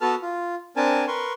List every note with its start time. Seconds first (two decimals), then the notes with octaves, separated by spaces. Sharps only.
0.01 B3 F#4 A4 B4 A5 F6
0.22 F4
0.77 C4 D4 A#4 G#5 A5
1.07 A#4 B4 C6 C#6